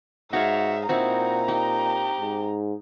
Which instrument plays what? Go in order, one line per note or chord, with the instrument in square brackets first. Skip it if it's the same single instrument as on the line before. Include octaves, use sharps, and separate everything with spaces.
[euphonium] G#2 [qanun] D#4 C#5 F5 [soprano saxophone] F#4 [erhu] E5
[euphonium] A#2 [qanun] C4 D#4 E4 [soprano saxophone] F#4 [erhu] A#5
[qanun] D#4 [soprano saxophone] G4
[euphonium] G#2